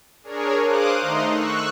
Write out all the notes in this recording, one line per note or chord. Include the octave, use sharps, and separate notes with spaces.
D4 G#4 A#4 C#5
C5 F5 D6 D#6 F#6
D#3 A3 D#4 A#5 C6
C#6 E6 F#6